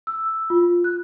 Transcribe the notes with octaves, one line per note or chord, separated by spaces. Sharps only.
E6
F4
F#6